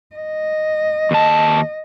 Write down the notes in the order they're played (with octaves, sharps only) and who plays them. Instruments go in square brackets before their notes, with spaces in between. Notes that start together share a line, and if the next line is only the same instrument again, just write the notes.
[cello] D#5
[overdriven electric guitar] D#2 A5